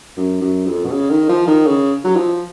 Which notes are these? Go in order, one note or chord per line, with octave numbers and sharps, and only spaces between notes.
F#2
F#2
F2
B2
C#3
D#3
F3
D#3
C#3
F#3
F3